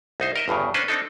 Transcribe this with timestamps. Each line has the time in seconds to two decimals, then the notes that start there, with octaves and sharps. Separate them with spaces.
0.20 C2 D#4 C5
0.36 A#4 D#5 E5
0.48 G1 E2 G2 C#3
0.74 C#4 D4 B4 C5
0.88 C4 D4 D#4 A4